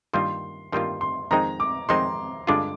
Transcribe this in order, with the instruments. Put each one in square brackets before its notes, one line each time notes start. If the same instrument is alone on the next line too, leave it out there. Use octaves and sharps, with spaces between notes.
[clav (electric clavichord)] G2 D#3 G3 A#3 F4 [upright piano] C6
[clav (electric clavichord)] G2 D#3 G3 A#3 F4 [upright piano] C6
[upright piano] C6
[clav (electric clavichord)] F2 D#3 G#3 C4 D#4 [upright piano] A#5
[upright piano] D6
[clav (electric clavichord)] F2 D#3 G#3 C4 D#4 [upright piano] C6
[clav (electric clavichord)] G2 D3 G#3 D4 F4 [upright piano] D6